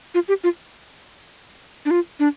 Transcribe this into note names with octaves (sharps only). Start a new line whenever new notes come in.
F4
G4
F4
D4
F4
D4